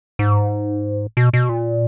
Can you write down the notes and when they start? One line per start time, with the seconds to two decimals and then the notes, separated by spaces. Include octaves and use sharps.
0.19 G#2
1.17 B2
1.33 B2
1.49 A#2